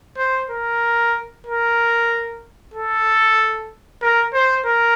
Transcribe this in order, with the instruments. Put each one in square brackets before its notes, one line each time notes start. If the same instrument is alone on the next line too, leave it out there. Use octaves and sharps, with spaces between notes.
[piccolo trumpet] C5
A#4
A#4
A4
A#4
C5
A#4